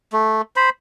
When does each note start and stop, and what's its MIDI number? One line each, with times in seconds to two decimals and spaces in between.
0.13 0.42 57
0.56 0.70 72
0.56 0.70 83